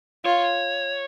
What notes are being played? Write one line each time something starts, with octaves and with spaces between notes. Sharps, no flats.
F4 C#5